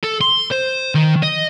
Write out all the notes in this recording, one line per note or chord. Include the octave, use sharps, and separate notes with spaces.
A4
C6
C5
D#3
D#5